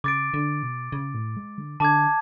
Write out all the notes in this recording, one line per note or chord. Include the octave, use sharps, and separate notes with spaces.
C#3 D6 A6 D7
D3
B2
C#3
A2
G#3
D3
D3 A5 D6 G#6